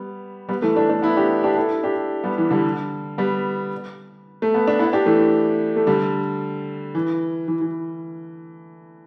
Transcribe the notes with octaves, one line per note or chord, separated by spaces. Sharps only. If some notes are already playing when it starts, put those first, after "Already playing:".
Already playing: G3 B3
G3 B3
E3 A3
A3 D4
A3 D4
B3 E4
D4 G4
D4 G4
E4 A4
D4 G4
G3 B3
E3
D3 G3
G3 B3
A3
B3
D4
B3 E4
D4 G4
E3 A3
A3
D3 G3
E3
E3
E3